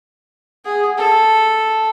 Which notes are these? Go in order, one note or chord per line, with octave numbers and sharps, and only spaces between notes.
G#4 F#5
A4 A5